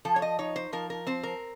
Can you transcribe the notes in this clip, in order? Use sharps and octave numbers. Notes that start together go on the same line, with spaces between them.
F3 A4
C#5
D#5
D#4 C#5
C5
F3 A#4
A#4
C4 C5
A#4